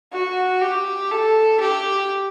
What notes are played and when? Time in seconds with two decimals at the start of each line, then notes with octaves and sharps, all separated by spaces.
0.13 F#4
0.62 G4
1.11 A4
1.60 G4